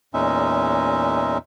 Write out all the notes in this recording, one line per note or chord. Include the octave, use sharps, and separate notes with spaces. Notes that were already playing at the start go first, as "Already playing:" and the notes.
E2 A#2 G#3 C#4 D#4 E5